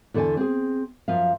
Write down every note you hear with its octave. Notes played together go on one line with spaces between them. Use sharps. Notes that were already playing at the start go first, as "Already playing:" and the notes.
E2 D3 A4 D5 G#5 A5
C4 G#4
F#2 F3 E5 F5